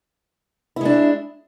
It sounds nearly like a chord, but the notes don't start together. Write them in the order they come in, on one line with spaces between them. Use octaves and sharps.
E4 G#3 D4